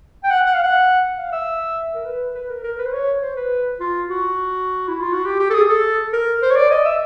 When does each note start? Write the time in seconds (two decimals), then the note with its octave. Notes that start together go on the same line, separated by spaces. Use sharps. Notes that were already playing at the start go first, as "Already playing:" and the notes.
0.24 G5
0.30 F#5
0.46 F#5
0.54 F5
0.63 F#5
1.18 F5
1.32 E5
1.95 A#4
2.05 B4
2.34 B4
2.49 A#4
2.63 A#4
2.78 B4
2.86 C5
2.93 C#5
3.22 C5
3.36 B4
3.80 F4
4.09 F#4
4.88 E4
5.00 F4
5.13 F#4
5.25 G4
5.39 G4
5.50 A4
5.54 G#4
5.69 A4
6.13 A#4
6.42 C5
6.51 C#5
6.56 D5
6.71 D#5
6.85 E5